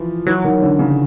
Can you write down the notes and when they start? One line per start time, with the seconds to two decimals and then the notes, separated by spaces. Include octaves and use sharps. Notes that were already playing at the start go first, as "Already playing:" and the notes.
Already playing: E3 F3
0.27 E3 F#3
0.44 D#3
0.62 D3
0.79 C#3